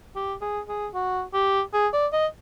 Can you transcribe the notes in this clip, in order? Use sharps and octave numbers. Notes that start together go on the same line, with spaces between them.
G4
G#4
G#4
F#4
G4
G#4
D5
D#5